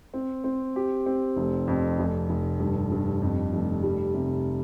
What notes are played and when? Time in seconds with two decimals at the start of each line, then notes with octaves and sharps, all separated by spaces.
0.14 C4
0.44 C4
0.76 G4
1.06 C4
1.36 F1
1.68 F2
1.99 F1
2.29 F1
2.60 G2
2.91 G2
3.22 F2
3.53 F1
3.83 G3
4.14 C3